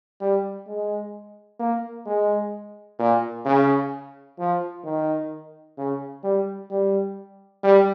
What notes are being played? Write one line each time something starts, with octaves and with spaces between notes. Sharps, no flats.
G3
G#3
A#3
G#3
A#2
C#3
F3
D#3
C#3
G3
G3
G3